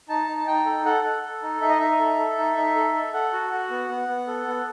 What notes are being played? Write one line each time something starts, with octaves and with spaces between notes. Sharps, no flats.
D#4 A5
D#4
A5
D#4 G5
A4
A4 F#5
A4
A4
D#4
D#4 E5
D#5
D#4 E5
A4
A4
D#4
D#4
A4
A4
A4 F#5
F#4
F#4
B3
B3
B3
A4
B3